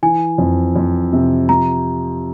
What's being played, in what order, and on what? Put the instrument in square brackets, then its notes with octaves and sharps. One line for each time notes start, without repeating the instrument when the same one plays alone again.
[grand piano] E3 [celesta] G#5
[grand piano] F2
F2
C3
[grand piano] F3 [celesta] A#5